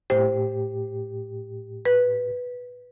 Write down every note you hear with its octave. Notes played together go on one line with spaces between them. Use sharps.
A2 G4 C5
B4